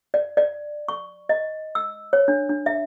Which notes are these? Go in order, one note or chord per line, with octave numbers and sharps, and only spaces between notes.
D5
D5
C#6
D#5
E6
C#5
D4
D4
E5